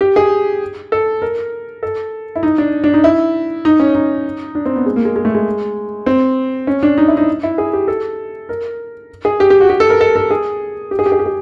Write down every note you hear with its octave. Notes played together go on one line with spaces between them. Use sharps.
G4
G#4
A4
A#4
A4
E4
D#4
D4
D4
D#4
E4
D#4
C#4
D#4
D4
C4
B3
G#3
A#3
G#3
G#3
A3
G#3
C4
C#4
D4
D#4
E4
D#4
E4
G#4
G4
A4
A#4
G#4
G4
G4
F#4
G4
A4
A#4
A4
A4
G#4
G4
G#4
G4
G#4
G4
G#4